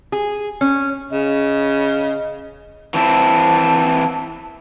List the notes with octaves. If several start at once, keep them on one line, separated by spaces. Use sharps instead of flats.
G#4
C#4
C#3 D#5
E3 C4 E4 A5